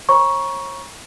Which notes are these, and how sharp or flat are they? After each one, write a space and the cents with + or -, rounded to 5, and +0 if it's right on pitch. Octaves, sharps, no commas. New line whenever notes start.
C#5 -40 A#5 +30 C#6 +0